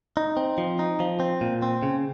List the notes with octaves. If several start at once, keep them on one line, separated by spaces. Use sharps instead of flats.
D#4
C4
F3
D#4
F3
C4
A#2
C4
C#3